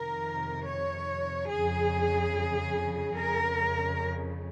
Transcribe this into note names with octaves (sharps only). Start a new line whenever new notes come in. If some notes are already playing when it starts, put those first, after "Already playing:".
Already playing: F2 C3 D#3 A#4
C#5
F2 C#3 G#4
F2 C#3 A#4